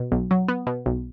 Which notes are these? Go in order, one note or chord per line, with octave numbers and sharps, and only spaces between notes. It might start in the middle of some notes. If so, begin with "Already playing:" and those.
Already playing: B2
B1
F#3
B3
B2
B1